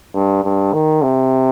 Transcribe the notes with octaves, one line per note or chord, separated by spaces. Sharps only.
G2
G2
D#3
C3